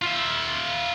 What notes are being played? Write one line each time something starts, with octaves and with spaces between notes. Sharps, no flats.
F4 E5